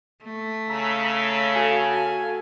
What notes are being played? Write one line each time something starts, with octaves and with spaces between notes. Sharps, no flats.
A3
C#3 A#5 E6 B6
F#4 A4 F5 G#5